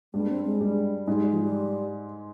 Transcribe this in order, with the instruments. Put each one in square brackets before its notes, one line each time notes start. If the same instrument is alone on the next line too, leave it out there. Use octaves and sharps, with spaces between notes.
[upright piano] G2 G3 [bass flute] G#3
[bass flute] A#3
C4
G#3
[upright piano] G2 G3
[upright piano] G#2 G#3 [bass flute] G3
[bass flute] G3
F3
G3